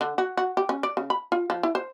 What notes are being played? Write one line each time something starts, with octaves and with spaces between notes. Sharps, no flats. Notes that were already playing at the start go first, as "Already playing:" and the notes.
D3
F#4
F#4
G4
C#4
D5
C#3
B5
F4
F3
E4
C5